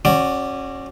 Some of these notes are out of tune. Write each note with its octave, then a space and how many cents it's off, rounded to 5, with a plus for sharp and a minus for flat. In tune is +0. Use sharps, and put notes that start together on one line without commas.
C#4 -25 F#4 +0 D5 +0